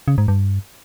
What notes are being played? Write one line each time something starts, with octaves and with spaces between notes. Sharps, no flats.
C#3
G#2
G2